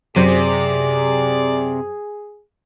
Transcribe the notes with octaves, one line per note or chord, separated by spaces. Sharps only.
F#2 C3 F#3 G#4 C5 D5